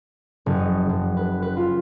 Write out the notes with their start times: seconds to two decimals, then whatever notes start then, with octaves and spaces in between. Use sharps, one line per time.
0.46 F#1
0.59 D#5
0.89 F#1
1.17 B4
1.42 B4
1.57 F4